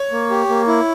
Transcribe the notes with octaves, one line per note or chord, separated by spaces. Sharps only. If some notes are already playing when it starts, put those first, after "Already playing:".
Already playing: C#5
A#3
G4
A#3
E4